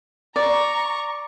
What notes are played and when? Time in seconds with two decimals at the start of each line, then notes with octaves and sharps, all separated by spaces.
0.36 D5 A#5 C#6